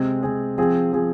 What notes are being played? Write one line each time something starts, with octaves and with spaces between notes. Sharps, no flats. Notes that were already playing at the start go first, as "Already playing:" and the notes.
Already playing: C3 G#3 C4 G#4
C3 G#3 C4 G#4
F3 C4 G#4
F3 C4 G#4